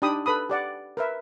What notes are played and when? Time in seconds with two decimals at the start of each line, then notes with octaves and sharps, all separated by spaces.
0.02 D4 D#4 G4 G5 B5 D#6
0.26 A4 B4 B5 D#6
0.49 G4 D5 F#5
0.97 A#4 B4 E5